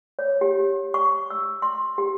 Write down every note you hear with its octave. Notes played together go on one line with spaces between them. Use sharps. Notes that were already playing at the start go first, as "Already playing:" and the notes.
C#5
G4
C#6
E6
C6
G4